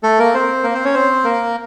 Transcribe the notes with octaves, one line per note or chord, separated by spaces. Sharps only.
A3 A4
A#3 A#4
C4 C5
A#3 A#4
C4 C5
C#4 C#5
C4 C5
A#3 A#4